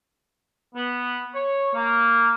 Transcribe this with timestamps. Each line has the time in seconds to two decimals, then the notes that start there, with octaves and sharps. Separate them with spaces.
0.75 B3
1.35 C#5
1.74 A#3